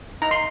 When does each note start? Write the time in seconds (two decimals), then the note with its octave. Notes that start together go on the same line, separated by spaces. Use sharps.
0.22 D#4 A#5
0.31 C6